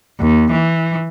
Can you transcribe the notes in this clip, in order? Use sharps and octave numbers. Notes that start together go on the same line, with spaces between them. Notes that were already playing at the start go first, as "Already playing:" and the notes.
D#2
E3